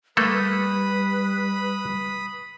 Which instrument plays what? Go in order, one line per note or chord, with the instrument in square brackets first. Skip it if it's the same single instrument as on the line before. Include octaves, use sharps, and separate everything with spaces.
[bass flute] G3 [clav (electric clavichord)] A3 A#3 A4 [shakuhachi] B4 [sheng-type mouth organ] B5 D#6